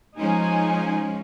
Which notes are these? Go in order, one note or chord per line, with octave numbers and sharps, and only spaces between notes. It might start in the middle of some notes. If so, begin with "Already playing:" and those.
F3 G#3 C#4 D#4 G#5